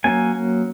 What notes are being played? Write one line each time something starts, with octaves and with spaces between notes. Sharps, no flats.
F#3 A#3 C#4 G#5